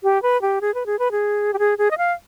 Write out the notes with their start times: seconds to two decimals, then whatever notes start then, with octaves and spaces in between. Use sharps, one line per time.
0.03 G4
0.22 B4
0.42 G4
0.61 G#4
0.74 B4
0.86 G#4
0.99 B4
1.12 G#4
1.53 G4
1.59 G#4
1.78 G#4
1.91 D#5
1.98 F5